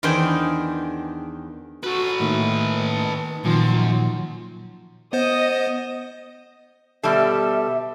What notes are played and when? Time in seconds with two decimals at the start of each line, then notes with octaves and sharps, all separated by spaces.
0.03 E2 D#3 D4 G#4 C5 G5
1.83 F#4 A4 B4
2.20 A2 D#3 A#3
3.45 F#2 A#2 D#3 F3 F4
3.86 F4
5.13 B3 C5 D#5 D#6
7.03 B2 G3 A4 E5